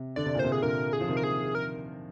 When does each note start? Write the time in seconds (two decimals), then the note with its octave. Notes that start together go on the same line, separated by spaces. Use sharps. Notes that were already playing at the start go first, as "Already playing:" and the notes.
Already playing: C3
0.16 D3 D5
0.25 C3
0.35 A#2
0.39 C3 C5
0.52 G#4
0.62 A#2 D3 A#4
0.93 G#4
1.01 F3
1.08 C3 D#3
1.17 A#4
1.23 G#4
1.55 A#4